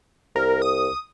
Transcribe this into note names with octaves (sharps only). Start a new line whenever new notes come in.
C2 A#4
D#6